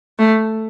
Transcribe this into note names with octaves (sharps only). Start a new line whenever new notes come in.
A3